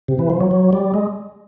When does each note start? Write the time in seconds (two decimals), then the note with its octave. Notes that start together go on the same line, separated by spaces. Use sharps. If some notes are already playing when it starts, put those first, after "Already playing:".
0.08 C3
0.19 E3
0.30 F3
0.40 F#3
0.51 F#3
0.73 G3
0.94 G#3